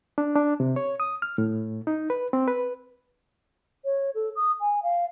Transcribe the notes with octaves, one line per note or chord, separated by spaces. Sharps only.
D4
D4
C3
C#5
D#6
F6
A2
D#4
B4
C4
B4
C#5
A4
D#6
G#5
F5